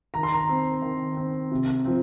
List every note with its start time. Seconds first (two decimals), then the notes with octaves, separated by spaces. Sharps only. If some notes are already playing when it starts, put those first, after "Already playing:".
0.14 D#3 A#5
0.23 C6
0.32 A#5
0.49 C4
0.82 D#3
1.17 C4
1.51 C3
1.85 F3 C4